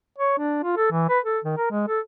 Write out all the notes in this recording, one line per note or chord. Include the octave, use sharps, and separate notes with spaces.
C#5
D4
F4
A4
E3
B4
A4
D#3
A#4
G#3
A4